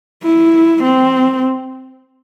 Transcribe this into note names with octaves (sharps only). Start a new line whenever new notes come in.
E4
C4